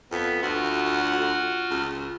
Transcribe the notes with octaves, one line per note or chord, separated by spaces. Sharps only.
F2 B3
D2 F4 F#4 F#5 F6
C#2